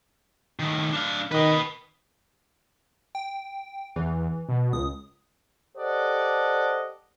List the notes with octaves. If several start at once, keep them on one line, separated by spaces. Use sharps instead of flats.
A2 D#3
D4 F5
D#3 B4 D#5
G5
E2 E3
B2
C#2 D#6
G4 A4 C5 D5 D#5 F#5